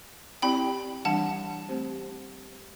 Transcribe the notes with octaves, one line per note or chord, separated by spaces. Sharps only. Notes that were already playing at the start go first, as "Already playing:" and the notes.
C4 E4 G4 D5 G5 B5
E3 G3 D4 F#5 A5
A3 C4 G4 C5